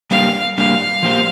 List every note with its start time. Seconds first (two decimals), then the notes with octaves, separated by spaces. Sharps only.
0.11 G3 A#3 D4 G4 F5
0.58 G3 A#3 D4 G4 F5
1.03 F3 A#3 G4 C5